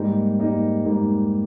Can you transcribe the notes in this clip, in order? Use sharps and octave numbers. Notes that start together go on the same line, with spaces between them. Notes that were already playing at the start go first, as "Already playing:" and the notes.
Already playing: G#2 G3 A#3 D#4
G#2 G3 A#3 D#4
G#2 G3 A#3 D#4